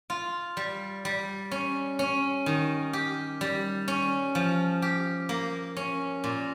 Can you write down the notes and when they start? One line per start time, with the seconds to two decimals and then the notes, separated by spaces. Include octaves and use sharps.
0.10 F4
0.57 G3
1.05 G3
1.51 C#4
1.99 C#4
2.46 D#3
2.93 G4
3.41 G3
3.88 C#4
4.35 F3
4.82 G4
5.29 A#3
5.76 C#4
6.24 A#2